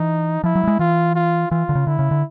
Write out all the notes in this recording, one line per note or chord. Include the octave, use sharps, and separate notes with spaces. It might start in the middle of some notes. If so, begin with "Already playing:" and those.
Already playing: E3 D#4
F3 E4
F#3
G3
G#3
E3 F4
F4
E3 F4
D3
C#3
D3 E4
C#3
D3